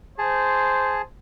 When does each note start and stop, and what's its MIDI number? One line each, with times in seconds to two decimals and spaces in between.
0.18 1.02 68
0.18 1.03 72
0.18 1.02 81